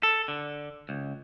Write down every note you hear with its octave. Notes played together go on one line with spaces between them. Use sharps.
A4
D3
C#2